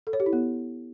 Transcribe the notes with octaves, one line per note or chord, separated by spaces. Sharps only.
A4
C#5
G4
E4
B3